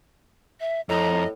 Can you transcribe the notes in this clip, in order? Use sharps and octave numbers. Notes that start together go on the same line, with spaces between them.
E5
F2 A2 D#5 A#5